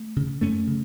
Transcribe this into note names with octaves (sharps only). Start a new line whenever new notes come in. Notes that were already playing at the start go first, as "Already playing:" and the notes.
Already playing: A3
C#3
F#2 A3 C#4
C#3